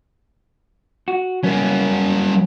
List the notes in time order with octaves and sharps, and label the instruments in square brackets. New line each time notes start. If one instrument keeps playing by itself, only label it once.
[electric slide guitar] F#4
[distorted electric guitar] F#3 A#3 [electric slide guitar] G3 B3 C#4